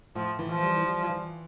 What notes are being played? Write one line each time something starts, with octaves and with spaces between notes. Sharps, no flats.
A2 F3
E3
F3
G3
G3
E3